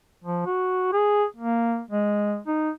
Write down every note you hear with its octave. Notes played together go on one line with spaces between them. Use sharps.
F3
F#4
G#4
A#3
G#3
D#4